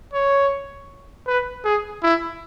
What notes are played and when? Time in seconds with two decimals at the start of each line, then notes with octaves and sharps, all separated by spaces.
0.13 C#5
1.27 B4
1.65 G#4
2.03 E4